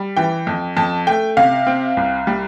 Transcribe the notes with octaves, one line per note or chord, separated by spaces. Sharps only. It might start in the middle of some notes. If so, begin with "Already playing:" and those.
Already playing: G3
E3 G5
F2
F2 A5
A3 G5
C3 F5
C4
C2
G3